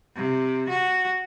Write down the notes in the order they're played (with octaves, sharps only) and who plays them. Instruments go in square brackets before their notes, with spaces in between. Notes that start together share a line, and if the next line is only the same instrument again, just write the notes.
[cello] C3
F#4